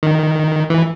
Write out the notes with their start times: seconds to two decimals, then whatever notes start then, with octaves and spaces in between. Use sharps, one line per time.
0.03 D#3
0.70 E3